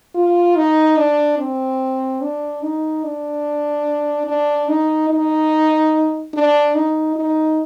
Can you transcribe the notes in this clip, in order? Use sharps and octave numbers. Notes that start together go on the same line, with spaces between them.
F4
D#4
D4
C4
D4
D#4
D4
D4
D#4
D#4
D4
D#4
D#4